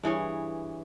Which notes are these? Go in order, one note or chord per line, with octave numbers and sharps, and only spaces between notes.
G2 E3 G#4 C#5